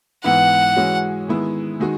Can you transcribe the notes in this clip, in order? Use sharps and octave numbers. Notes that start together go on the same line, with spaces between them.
G#2 E3 B3 E4 F#5
E3 G#3 C#4 F#4
D#3 G#3 B3 E4
D#3 G#3 D#4 F#4